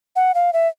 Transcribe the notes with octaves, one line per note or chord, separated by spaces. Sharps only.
F#5
F5
E5